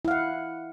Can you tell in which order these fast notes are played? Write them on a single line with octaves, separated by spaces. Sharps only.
E4 F5 F#5